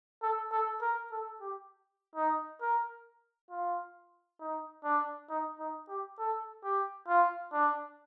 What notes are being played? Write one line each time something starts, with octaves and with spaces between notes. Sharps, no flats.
A4
A4
A#4
A4
G4
D#4
A#4
F4
D#4
D4
D#4
D#4
G4
A4
G4
F4
D4